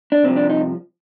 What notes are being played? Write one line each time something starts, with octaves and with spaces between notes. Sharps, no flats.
D4
C2 C3 F3 C4
D4
D#4